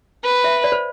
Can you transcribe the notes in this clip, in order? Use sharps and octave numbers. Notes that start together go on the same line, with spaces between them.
B4
E5
D5
C5